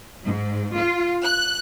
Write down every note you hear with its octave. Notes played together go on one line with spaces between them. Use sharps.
G#2
F4
F#6